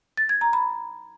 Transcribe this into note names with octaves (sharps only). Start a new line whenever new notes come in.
A6
G#6
A#5
B5